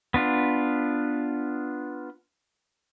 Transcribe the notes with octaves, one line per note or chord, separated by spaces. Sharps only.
B3 D4 F4